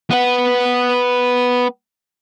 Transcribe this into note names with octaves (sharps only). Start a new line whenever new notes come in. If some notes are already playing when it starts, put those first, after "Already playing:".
B3 F#5